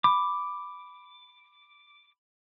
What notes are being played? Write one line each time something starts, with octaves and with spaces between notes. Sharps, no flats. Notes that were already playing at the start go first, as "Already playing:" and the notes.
B5 D6